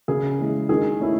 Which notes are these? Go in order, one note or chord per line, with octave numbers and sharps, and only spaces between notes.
C#3 G#4
E3 G#3
D#3 G#4
A3 C#4 E4